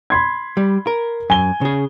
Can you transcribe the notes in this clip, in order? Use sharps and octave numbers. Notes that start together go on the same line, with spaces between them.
B5 C6 G#6
G3
A#4
F#2 G#5 G7
C#3 G#4